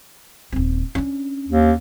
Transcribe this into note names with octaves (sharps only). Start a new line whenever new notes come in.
D#1 C4
C#4 D4
D#2